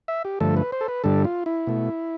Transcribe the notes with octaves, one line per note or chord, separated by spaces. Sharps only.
E5
G4
G2 D3 F3 A3 A4
B4
C5
A4
B4
G2 D3 G3 A4
F4
E4
B2 A3